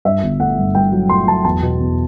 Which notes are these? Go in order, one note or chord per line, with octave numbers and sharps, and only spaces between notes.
G2 E5
G1
A3 F#5
G2
G2 G5
F#3
A3 C6
F#3 A5
E2 A5
B2
E2